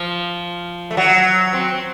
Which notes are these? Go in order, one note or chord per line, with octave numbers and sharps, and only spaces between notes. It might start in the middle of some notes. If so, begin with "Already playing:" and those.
Already playing: F3
A3
F#3
C4